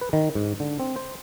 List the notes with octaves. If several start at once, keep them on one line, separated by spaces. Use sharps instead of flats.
B4
D#3
G#2
D3
C4
C5